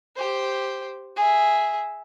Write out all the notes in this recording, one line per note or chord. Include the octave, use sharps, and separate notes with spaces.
G4 C5
G#4 E5